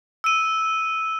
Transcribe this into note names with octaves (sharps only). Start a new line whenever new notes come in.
E6 D#7